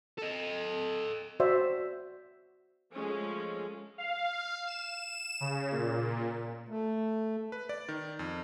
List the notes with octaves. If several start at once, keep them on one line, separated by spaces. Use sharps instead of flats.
A4 D#5
F#4 C5 D5 E5
F3 G#3 A3 C#4
F5
E7
C#3
A#2
A3
B4
D5
D#3
F2